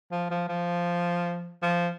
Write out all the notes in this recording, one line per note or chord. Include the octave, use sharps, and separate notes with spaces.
F3
F3
F3
F3